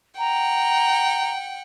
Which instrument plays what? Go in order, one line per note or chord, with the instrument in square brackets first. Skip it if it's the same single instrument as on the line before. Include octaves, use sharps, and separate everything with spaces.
[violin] F#5 G5 [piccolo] A#5